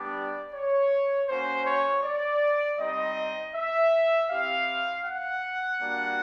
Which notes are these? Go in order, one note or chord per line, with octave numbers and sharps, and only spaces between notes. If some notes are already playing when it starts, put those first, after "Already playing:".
Already playing: G3 B3 D4 G4 D5
C#5
A#3 C#4 F#4 C5
C#5
D5
G3 C4 D#4 G4 D#5
E5
C4 E4 G4 F5
F#5
G3 A#3 D4 F#4